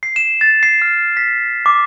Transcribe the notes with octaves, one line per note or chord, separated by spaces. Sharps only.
C7
E7
A6
C7
F6
B6
D6